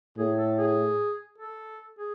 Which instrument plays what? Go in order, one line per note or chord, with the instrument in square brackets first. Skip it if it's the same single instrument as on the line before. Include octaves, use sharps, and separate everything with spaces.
[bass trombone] A2 [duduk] G#4
[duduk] A4
G#4
A4
G#4